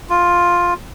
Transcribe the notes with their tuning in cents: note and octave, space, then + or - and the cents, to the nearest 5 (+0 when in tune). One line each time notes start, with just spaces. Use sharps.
F4 +5